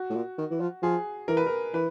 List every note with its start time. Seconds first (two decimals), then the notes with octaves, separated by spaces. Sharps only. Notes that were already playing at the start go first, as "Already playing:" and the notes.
Already playing: F#4
0.10 A2
0.14 A#2
0.38 D#3
0.51 E3
0.60 F3
0.82 F3 G#4
1.28 E3 A#4
1.37 B4
1.46 A#4
1.73 E3 B4